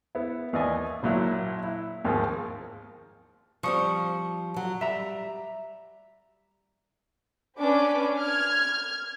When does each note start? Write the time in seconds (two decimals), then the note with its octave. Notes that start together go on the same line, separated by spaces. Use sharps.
0.15 B3 E4
0.53 D#2 E3 D5 D#5 G#5
1.03 A#1 A#2 F#3 E4
1.63 E4
2.05 D#2 G#2 F3 G#3 A#3
3.63 F3 G3 C4 C#6 D#6 C#7
4.56 F#3
4.81 G3 E5 A#5
7.58 C#4 D4 B4 D6
8.19 F6 G#6